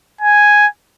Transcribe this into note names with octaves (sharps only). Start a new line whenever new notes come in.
G#5